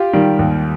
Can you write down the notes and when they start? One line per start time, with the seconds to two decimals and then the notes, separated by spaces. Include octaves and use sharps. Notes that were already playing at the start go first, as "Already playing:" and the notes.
Already playing: F4 G4
0.13 D#3 G3
0.39 D#2